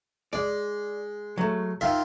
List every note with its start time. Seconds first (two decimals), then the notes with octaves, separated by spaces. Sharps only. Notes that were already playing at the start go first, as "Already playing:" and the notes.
0.33 G#3 D5
1.37 F#3 A3
1.81 D#3 F4 E5